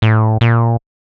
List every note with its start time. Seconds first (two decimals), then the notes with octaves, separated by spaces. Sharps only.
0.02 A2
0.41 A#2